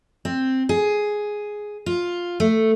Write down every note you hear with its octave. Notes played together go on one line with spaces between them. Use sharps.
C4
G#4
F4
A3